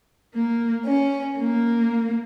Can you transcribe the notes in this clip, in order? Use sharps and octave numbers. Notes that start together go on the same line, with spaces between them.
A#3
C#4
A#3